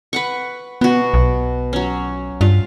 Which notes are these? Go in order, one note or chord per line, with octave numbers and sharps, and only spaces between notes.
B4 F#5 C#6
B2 B3 F#4
B1
F#3 C#4
G2 F4